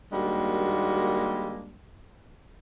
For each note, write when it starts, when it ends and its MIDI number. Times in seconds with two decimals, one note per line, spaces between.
0.12 1.73 39
0.12 1.73 55
0.12 1.73 56
0.12 1.73 58
0.12 1.73 62
0.12 1.73 66